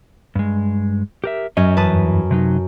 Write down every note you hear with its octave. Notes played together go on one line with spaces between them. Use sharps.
G2 G#3
G4 A#4 E5
F#2 C#4 C#5 D#5
E2 G2 E3 B4 A5 D#6
C3 F#3 D#4